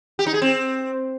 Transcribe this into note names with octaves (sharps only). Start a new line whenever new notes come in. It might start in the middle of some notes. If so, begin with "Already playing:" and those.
G4
D#4
G#4
C4